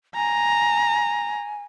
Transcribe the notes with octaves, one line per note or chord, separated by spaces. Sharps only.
G#5 A#5